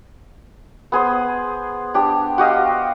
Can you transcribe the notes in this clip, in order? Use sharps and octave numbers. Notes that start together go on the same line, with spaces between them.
B3 G#4 C5
D4 G4
F#4 G4 D#5 F5